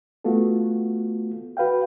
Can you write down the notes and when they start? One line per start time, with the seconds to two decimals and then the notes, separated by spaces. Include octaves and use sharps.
0.24 A3 B3 F4 F#4 A4
1.57 F#4 B4 F5 G5